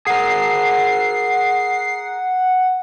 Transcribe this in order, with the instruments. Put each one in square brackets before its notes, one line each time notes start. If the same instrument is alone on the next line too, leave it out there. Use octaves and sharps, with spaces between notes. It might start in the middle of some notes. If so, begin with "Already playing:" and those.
[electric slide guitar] G#4 A#4 [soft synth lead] F#5 [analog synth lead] C7